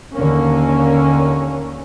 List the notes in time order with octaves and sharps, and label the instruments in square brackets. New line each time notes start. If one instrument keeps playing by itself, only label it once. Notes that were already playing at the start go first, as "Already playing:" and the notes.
[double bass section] D#2 D3 A#3 C#4